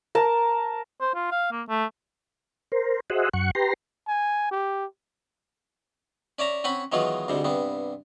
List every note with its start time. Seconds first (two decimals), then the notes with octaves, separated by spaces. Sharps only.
0.15 A#4 A5
1.01 C5
1.15 F4
1.31 F5
1.52 A#3
1.69 A3
2.72 A#4 C5
3.10 F#4 G#4 C5 D#5 E5 F#5
3.34 F#2 F#5 C#6
3.55 G4 B4 A#5 C6
4.08 G#5
4.51 G4
6.39 C#4 D5 E5 A#5
6.64 C4 C#4 F#5 G#5 B5
6.92 D#3 E3 F#3 G#3 B3 F4
7.28 D2 G#2 C3 G3
7.44 G2 C3 B3